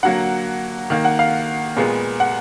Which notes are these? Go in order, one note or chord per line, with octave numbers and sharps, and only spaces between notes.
D3 F#3 A#3 F#5
D#3 A#3
F#5
F5
A#2 G#3 B3
F#5